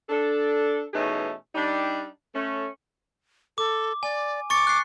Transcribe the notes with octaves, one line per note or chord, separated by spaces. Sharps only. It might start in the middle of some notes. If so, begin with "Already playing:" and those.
D4 A4
B2 E3 A3 C#4 D#4 G#4
G3 D4 D#4
A3 C#4
A4 D6
D5 G#5
C#6 D6 A6 C#7
F#6 C7